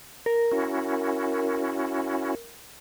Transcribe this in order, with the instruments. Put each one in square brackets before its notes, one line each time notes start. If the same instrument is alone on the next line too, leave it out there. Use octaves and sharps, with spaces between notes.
[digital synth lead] A#4
[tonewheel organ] C#4 E4 F#4